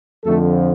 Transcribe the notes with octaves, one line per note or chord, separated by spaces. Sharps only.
F2 D3 F3 A3 A4